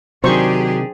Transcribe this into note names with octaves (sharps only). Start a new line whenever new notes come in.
C3 D#3 F#3 D4 G4 G#4 C5 C#6